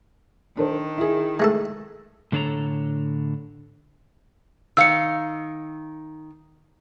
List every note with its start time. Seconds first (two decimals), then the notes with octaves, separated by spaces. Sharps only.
0.57 D#3 D4 A4 C5
0.98 E4 G#4
1.40 G#3 A3 A4
2.32 A2 D3 D4 A4 C#5 A#5
4.77 D#3 F5 E6 C#7